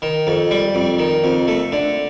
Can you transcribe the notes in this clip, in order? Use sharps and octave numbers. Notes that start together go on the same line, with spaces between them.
D#3
F2
G3
F2
D#3
F2
A3
D3